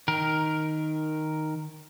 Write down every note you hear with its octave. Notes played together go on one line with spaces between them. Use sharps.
D#3 A#4